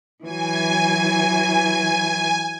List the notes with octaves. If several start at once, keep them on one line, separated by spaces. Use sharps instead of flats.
E3 F#3 G#5